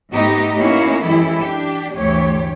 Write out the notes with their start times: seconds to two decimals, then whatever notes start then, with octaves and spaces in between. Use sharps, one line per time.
0.11 G#2 A3 B3 D#4 G4
0.56 A#3 B3 C#4 D#4 E4 F#4
1.03 F#2 E3 G#3 E4 G4 A4
1.39 D4 G4
1.95 D2 G2 E3 A3 G4 C#5